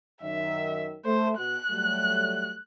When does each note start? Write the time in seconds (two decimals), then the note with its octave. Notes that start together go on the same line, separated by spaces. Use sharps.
0.22 F#2 D#3 E5
1.05 A3 C5
1.38 B2 F#6
1.70 F#3 G3 A3